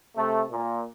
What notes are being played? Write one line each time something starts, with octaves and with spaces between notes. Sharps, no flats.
C3 A3
A#2